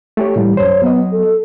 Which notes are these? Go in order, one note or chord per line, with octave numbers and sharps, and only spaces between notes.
A3 G4 C#5
A2 E3 G3
F#2 C5 C#5
F#3 B3 D#5
A4